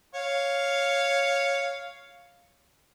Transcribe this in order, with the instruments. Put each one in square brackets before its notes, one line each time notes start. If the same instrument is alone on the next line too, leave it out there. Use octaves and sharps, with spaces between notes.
[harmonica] C#5 F5